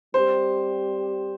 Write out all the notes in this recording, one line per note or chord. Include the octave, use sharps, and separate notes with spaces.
G3 C4 G4 C5